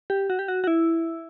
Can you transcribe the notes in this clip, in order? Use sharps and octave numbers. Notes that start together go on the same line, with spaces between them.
G4
F#4
G4
F#4
F#4
E4